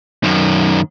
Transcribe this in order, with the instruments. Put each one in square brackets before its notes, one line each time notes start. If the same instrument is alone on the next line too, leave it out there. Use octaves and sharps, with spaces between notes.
[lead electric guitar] F#2 D#3